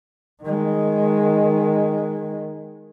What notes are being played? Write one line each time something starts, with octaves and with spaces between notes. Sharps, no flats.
D#3 G#3